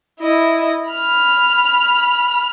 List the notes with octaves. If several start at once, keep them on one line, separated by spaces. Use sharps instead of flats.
E4 D#5
B5 F6